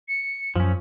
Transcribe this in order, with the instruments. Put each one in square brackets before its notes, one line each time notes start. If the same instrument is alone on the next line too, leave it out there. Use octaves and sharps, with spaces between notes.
[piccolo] C#7
[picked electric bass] F#2 [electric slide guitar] F3 C#4